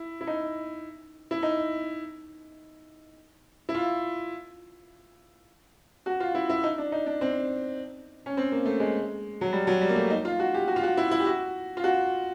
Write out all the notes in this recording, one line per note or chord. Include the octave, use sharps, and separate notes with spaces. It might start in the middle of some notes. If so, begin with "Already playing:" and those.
Already playing: E4
E4
D#4
E4
D#4
E4
F4
F#4
F4
E4
E4
D#4
D4
D#4
D4
C4
C#4
C4
A#3
A3
G#3
F#3
G3
F#3
G3
A#3
A3
D#4
F4
F#4
G4
F#4
F4
F#4
E4
E4
G4
F#4
F4
F#4